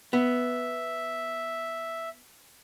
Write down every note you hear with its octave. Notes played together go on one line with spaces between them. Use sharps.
B3 E5